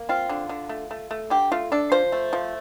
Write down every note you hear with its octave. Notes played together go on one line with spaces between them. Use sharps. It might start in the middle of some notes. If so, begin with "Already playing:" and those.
Already playing: A#3
C4 F4
D3
D3
A3
A3
A3
D3 G4
A3 F4
D4 A4
F3 C5
A3
F3